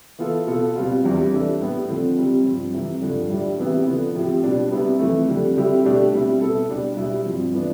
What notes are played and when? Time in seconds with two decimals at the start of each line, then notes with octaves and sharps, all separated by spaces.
0.19 E3 B3 F4 A4
0.47 B2 B3 F4 A4
0.76 B2 G3 C4 F4
1.04 E2 C3 G3 D4
1.32 E3 G3 D4 A4
1.61 A2 G3 B3
1.89 D3 F3 C4
2.17 C3 G3 C4
2.45 G2 F3 C4
2.74 F2 C3 E3
3.01 G2 D3 F3
3.30 A2 G3 D4
3.59 C3 E3 B3 E4 G4
3.86 D3 F3 B3
4.15 A2 F3 C4 G4
4.43 B2 G3 D4
4.71 C3 G3 B3 E4
4.99 F2 E3 A3
5.28 F2 D3 G3
5.56 D3 G3 C4 E4 G4
5.84 B2 A3 D4 G4
6.12 B2 G3 C4 E4
6.41 B2 B3 E4 A4
6.69 B2 G3 D4 G4
6.97 B2 G3 B3 E4
7.25 G2 F3 C4
7.53 E3 B3 D4